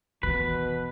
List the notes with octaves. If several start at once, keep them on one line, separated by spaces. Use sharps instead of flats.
D#2 B2 E3 B4